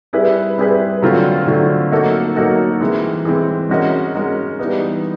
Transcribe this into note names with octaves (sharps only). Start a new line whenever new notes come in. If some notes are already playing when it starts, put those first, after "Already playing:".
G3 C4 E4 G#4 B4
G3 C4 E4 G#4 B4
D3 F#3 A3 C4 F4
D3 F#3 A3 C4 F4
F#3 A#3 D#4 F#4 A4
F#3 A#3 D#4 F#4 A4
E3 G#3 C4
E3 G#3 C4
G#3 C#4 F#4 A#4 D#5
G#3 C#4 F#4 A#4 D#5
E3 G3 B3 D#4